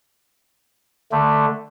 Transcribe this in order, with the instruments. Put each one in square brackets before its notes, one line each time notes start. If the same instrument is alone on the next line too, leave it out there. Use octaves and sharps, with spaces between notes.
[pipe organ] D3 A3